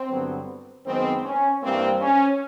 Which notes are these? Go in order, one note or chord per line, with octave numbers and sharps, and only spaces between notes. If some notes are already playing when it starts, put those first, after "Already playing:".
Already playing: C4
G2 D3 F#3 B3
F#2 D#3 G#3 B3 C4
C#4
G2 E3 G3 A#3 C4
C#4